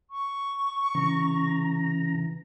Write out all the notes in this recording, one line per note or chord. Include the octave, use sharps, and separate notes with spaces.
C#6
C#3 E3 A#5